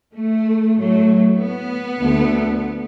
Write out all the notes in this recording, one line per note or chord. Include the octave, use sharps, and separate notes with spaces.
A3
A2 F#3 A3
B3
D2 D3 A3